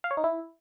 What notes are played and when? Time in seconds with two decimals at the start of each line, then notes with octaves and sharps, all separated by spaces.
0.04 F5
0.11 C#5
0.17 D#4
0.24 E4